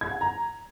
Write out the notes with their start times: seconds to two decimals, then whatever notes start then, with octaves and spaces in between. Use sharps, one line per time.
0.01 G#6
0.11 F#5
0.21 A#5